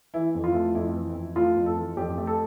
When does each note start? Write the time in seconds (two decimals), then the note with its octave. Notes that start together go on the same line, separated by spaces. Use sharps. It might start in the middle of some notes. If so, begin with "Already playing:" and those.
0.14 E3 E4
0.35 F2
0.44 F4
0.54 A3
0.75 F2 E4
0.96 E3
1.15 F2
1.36 A3 F4
1.56 F2
1.66 A4
1.76 E3
1.97 F2 G4
2.18 A3
2.27 A4